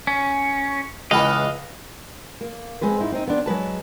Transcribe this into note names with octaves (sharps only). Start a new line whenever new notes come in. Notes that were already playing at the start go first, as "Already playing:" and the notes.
C#4
C#2 E3 B3 D#5 F5
A#3
G#3 C4 B4 C5
G#2 D#4 E4
C4 D#4
B3 C4 D4
F#3 G#3 B4 A5